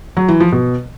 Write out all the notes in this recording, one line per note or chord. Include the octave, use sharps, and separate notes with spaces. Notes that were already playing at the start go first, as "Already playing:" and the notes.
F#3
E3
F3
B2